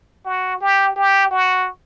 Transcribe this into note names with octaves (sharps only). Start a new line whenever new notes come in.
F#4
G4
G4
F#4